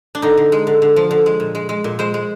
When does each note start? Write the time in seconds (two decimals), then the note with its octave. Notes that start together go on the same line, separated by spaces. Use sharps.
0.15 D4
0.22 D3 D#4
0.37 D3
0.52 G#3
0.67 D3
0.82 D3
0.96 F3
1.11 D3
1.26 G#3
1.40 A#2
1.55 G#3
1.69 G#3
1.84 A#2
1.99 G#3 C5
2.14 G#3